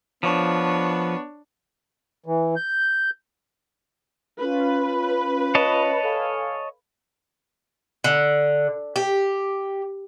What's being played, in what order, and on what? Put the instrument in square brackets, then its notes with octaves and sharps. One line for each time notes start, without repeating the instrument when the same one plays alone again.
[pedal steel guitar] F3 [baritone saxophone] B3 [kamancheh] D4 C#5
[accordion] E3
G6
[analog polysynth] C#4 F4 [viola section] B4
[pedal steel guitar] C#5 D#5 A5
[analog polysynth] A4 F5 G#5
[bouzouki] D3
G4